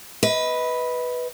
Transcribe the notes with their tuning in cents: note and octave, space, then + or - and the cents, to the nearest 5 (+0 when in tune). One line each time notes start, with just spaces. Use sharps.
B4 +0 D#5 +30